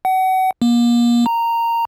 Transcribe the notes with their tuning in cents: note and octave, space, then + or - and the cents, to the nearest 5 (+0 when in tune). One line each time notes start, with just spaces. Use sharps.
F#5 +30
A#3 +35
A#5 -10